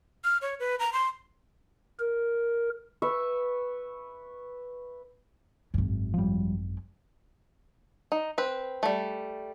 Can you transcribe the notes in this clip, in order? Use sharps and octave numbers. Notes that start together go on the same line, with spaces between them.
F6
C#5
B4
A#5
C6
A#4
B4 E5 C#6
G#1 F#2
F3 G3
D#4
C4 B4
G3 A3